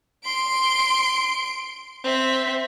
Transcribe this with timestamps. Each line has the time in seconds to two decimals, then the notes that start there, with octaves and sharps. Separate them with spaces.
0.25 C6 D7
2.04 C4 E5